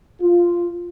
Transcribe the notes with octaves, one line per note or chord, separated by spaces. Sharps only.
F4